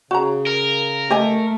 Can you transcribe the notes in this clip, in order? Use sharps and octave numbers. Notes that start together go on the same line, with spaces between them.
C#3 F#4 A#5
A#4
A3 G4 D#5 G#5